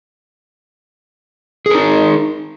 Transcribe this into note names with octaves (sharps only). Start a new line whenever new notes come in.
D#4 G#4 A#4